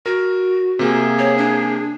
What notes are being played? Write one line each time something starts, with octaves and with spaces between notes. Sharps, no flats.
F#4 A#4
C3 A#3 G#4
C#5
D4